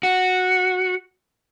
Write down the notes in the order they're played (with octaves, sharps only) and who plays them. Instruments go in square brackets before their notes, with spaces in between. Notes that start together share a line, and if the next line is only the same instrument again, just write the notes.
[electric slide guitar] F#4